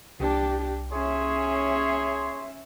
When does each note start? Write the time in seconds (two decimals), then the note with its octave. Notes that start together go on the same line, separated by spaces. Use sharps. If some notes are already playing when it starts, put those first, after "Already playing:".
0.20 C2 D4 G4
0.91 C#4 G#4 C#5 E5 C6